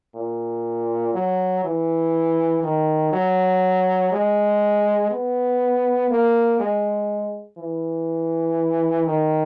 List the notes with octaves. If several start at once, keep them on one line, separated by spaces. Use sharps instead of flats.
A#2
F#3
E3
D#3
F#3
G#3
B3
A#3
G#3
E3
D#3